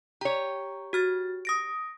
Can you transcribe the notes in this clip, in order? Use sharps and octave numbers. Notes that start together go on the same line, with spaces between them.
G4 C#5 A#5
F#4 F6 A6
D#6 A#6 D7